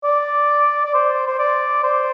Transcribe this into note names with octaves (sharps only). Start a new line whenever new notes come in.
D5
D5
C5
C5
D5
C5